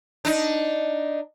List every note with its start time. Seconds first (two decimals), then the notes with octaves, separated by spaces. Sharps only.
0.25 D4 D#4